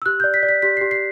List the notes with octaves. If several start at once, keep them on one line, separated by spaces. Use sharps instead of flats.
E6
G4 F#6
D5 G6
B6
D5
B6
G4 B6
G4 C7
C7